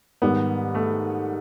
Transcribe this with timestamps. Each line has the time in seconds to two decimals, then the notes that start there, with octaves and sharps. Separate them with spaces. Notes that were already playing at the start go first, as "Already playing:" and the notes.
0.22 G#2 D#3 G3 B3
0.75 A3